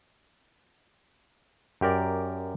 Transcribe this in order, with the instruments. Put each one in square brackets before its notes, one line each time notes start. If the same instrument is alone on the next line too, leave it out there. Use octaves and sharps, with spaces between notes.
[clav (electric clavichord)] F#2 G4 A#4 D5